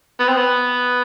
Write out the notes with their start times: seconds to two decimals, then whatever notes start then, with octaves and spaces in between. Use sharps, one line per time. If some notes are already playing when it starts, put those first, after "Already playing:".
0.20 B3
0.28 C4
0.37 B3